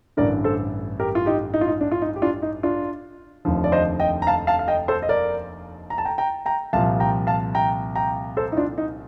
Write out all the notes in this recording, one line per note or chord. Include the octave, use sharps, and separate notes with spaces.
A1 G2 D3 A#4 D5
A4 C5
G4 A#4
F4
D#4 G4
D#4
F4
D#4
D4
F4
D#4
G4
D4 F4
D#4
D4 F4
F1 D#2 D3 F3
D5
C5 D#5
D#5 G5
A#5
F5 A5
F5 A5
F5
D#5 G5
A4 C5
D#5
A#4 D5
A#5
A5
G5 A#5
G5 A#5
G5 A#5
C2 A#2 F3 F5 A5
G5 A#5
F5 A5
G5 A#5
G5 A#5
A4 C5
D#4
D4 F4
D#4